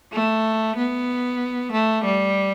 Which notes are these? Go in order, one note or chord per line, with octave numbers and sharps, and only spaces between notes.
A3
B3
A3
G3